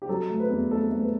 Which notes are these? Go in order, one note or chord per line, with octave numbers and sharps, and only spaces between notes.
G4
F#3 A4
A3
B4
E2
A3 A4
A3
B4